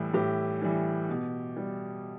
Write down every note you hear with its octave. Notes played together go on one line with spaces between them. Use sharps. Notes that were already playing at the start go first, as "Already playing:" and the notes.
Already playing: A2 E3 G3 E4
A2 G4
E3 G3
B2
G3